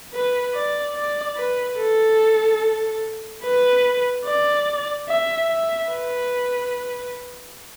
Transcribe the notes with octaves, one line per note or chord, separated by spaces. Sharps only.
B4
D5
D5
B4
A4
B4
D5
E5
E5
B4